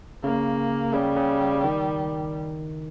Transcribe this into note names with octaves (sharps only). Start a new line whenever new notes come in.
C#3 A#3
C#3 G3
C#3
D#3